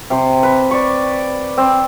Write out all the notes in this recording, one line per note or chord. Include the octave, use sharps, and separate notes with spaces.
C3 C6
B4
D5 C#6
C4